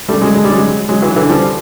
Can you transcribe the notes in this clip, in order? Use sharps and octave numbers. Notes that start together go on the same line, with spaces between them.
G3 A3
F#3 G#3
G#3
G3
F#3 G#3
F#3 G#3
E3 F#3
D3 E3
F3 G3